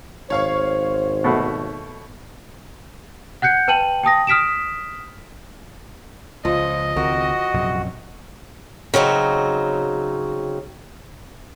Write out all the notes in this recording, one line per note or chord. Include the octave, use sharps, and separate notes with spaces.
G#1 C5 C#5 F5 C#6
B2 A3 F#5
F#5 F#6 G6 C#7
B4 G5 A5 D#7 F#7
G5 A5 D#6 A#6
D#6 F6 B6 D7 E7
C#2 F3 D#5
C#2 D#3 C4 F#4 A#4
A#1 F#2 C3
C#3 F#3 C4 D#4